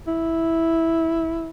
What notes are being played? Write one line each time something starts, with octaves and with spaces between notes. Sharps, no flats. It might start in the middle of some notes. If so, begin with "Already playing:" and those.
E4